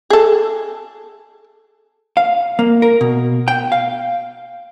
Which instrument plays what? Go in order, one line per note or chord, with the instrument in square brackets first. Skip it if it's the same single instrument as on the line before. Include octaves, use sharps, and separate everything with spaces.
[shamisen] G#4 A4
[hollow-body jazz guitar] F5
A#3
A#4
B2
G5
F5